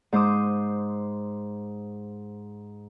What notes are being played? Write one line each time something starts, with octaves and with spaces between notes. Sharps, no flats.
G#2 C5 D6 D#6